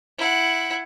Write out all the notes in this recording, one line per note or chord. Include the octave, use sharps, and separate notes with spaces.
E4 F#5